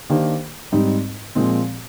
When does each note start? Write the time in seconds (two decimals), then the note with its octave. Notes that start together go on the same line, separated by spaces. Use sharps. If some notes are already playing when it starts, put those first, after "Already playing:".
0.10 D#3 A#3 D4 G4 C5
0.72 G#2 G3 C4 D#4
1.35 A#2 F3 G#3 C4